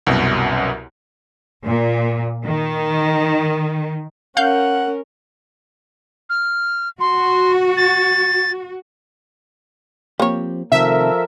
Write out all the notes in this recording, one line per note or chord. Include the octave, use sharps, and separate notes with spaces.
C2 F#2 B2
A#2
D#3
C#4 A#4 F5 F#5 G6
F6
F#4 C6
A6
F3 A#3 C4 G4 C#5
C3 D#3 F3 A3 A4 A#4 E5